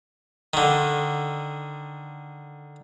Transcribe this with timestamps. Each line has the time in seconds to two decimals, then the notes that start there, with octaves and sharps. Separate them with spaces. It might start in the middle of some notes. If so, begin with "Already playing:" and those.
0.54 D3 D#3